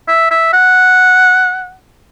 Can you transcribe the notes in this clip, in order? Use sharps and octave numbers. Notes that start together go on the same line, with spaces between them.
E5
E5
F#5